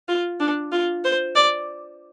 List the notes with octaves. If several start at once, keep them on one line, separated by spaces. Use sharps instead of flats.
F4
D4
F4
C5
D5